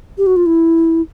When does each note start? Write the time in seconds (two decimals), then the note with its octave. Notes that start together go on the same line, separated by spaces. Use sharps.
0.18 G4
0.27 F#4
0.36 F4
0.46 E4